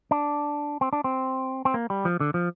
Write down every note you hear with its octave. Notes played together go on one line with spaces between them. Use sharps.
D4
C4
D4
C4
C4
A#3
G3
F3
D3
F3